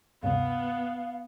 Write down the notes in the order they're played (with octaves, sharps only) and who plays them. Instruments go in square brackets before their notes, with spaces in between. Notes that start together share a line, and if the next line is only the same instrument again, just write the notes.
[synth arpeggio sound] D2 G2 C3 [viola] B3 [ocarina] F5